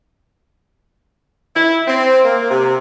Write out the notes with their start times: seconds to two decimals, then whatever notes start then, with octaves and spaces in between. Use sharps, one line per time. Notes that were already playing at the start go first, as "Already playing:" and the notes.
1.55 E4
1.87 C4
2.23 A#3
2.50 C3